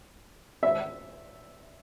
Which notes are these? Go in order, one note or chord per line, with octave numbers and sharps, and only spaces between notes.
E5